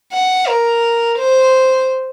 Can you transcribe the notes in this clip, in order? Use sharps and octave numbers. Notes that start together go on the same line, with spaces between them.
F#5
A#4
C5